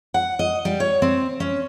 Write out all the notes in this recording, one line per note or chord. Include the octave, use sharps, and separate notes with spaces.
F#5
D#5
G3
C#5
C4
C#4